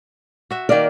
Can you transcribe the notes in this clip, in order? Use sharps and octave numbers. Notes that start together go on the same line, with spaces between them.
F#4 E5
D#3 A#3 A#4 D5